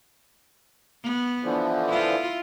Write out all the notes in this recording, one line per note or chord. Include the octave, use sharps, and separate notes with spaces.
B3
D3 E3 F3
E4 F4